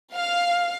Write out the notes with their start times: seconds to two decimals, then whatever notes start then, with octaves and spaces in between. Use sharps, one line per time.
0.15 F5